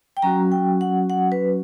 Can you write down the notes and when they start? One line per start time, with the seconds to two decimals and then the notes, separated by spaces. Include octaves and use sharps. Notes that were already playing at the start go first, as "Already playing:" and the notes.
0.17 G5
0.22 F#3 C#4 F#4 A#5
0.52 G5
0.81 F#5
1.10 F#5
1.32 B4